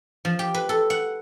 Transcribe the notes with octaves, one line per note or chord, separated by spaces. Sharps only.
F3
G4
B4
A4
F#5